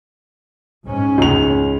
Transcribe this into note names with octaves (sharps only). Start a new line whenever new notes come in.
G#2 C#4
C#2 F7